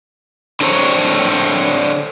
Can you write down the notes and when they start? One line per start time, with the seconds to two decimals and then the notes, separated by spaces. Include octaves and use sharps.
0.61 D3 D4 A4 C5 C#5 A#5